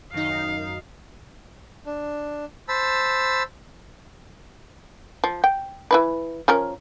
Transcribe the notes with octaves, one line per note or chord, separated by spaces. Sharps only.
F#2 D#3 D#4 F5
D4
C5 A5 B5 E6
F3
G5
E3 E4 B4
F3 C#4 A#4